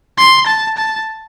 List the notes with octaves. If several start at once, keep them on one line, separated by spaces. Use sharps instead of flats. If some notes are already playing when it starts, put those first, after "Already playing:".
C6
A5
A5